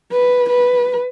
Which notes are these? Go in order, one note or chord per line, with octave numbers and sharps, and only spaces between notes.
B4
B4